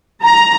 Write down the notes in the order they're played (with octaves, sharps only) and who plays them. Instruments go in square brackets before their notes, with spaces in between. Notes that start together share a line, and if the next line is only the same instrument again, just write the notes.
[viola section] A#5